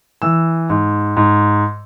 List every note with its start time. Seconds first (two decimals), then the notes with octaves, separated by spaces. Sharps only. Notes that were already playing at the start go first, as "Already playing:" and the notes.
0.22 E3 E6
0.70 G#2
1.17 G#2